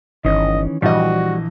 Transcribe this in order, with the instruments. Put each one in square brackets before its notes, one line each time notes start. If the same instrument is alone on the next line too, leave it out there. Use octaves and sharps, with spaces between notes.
[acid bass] G1 [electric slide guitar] D#3 E3 C#4 [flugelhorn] D#5
[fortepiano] A#1 D#5 [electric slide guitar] E3 [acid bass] G3 [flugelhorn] F#4